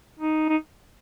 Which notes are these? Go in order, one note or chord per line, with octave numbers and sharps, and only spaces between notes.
D#4
D#4